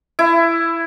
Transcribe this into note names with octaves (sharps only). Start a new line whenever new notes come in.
E4